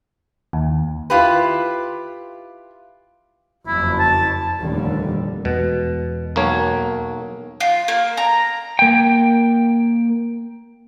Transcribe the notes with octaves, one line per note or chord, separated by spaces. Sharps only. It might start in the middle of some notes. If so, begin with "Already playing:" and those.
D#2
E4 F4 G4 B4
F#1 F2 E4
A5
F1 D#2 A#2 D3 G3
E2 B2 G#3
B1 A#3 C#5
F4
A#3
A#5
A#3 G5